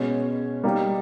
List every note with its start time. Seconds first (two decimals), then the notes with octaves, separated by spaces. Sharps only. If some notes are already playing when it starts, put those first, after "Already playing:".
Already playing: B2 G#3 C#4
0.64 G3 A#3 D#4